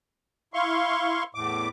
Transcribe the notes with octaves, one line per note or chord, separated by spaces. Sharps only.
E4 F5 C6 C#6
E2 A2 D6